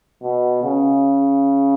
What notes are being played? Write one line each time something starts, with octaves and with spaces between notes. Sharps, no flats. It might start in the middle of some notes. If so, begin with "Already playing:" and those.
B2
C#3